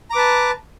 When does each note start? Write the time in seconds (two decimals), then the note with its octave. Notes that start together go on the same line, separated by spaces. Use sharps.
0.10 A#5
0.13 D6
0.16 B4
0.18 A5